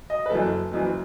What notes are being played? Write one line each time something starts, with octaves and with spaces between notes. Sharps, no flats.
D#5
B4
F#1 F#2 E3 A4
F#1 F#2 E3